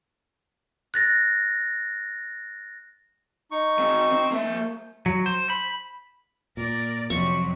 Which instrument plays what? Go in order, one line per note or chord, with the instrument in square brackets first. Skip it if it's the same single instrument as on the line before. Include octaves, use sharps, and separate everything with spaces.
[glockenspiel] F#6 A6 A#6
[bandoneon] D#4 C#6
[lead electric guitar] D#3 C4
C4
A#3 E5
[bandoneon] F3 G6
[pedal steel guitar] F#3
C5
B5
[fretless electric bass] A#2 [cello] A#4 D5
[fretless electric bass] F2 [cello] C3 F#3 [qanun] C#6